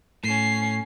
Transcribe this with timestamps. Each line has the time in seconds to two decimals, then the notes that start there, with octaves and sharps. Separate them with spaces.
0.24 A2 C#4 C7